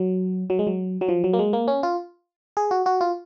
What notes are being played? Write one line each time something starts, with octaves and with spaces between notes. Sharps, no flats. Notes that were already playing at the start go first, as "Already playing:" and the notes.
Already playing: F#3
F#3
G#3
F#3
F#3
F3
F#3
A#3
G#3
A#3
C#4
F4
G#4
F#4
F#4
F4